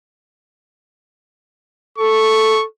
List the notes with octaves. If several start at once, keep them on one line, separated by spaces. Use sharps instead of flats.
A4 C#6